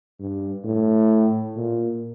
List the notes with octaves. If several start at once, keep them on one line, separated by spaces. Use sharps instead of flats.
G2
A2
A#2